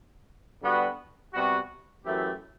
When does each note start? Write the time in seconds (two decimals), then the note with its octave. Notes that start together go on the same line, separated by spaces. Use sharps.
0.61 D3 G3 B3 F#4
1.34 C3 G3 B3 F#4
2.05 F#2 E3 A3 E4 G4